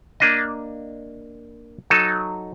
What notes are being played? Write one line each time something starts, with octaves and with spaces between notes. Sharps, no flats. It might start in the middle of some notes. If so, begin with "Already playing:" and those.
A#3 D4 D#5
F#3 D#4 A4